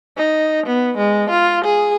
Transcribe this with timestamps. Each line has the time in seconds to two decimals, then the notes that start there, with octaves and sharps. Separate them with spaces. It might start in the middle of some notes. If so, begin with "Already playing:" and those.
0.17 D#4
0.66 B3
0.98 G#3
1.30 F4
1.64 G#4